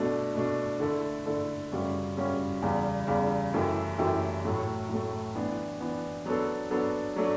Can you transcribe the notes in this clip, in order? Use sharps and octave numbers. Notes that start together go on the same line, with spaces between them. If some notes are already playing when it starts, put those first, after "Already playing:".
Already playing: B2 A3 D4
B2 A3 D4
D3 A3 E4 A4
D3 A3 E4 A4
F#2 C#3 G3 C#4 F#4
F#2 C#3 G3 C#4 F#4
E2 C#3 G3
E2 C#3 G3
F#2 E3 A3 E4 G4
F#2 E3 A3 E4 G4
A2 F#3 A3
A2 F#3 A3
E3 B3 D4
E3 B3 D4
F#3 B3 D4 A4
F#3 B3 D4 A4
F#3 A3 D4